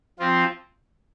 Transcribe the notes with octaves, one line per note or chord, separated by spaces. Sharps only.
F3 C4 F4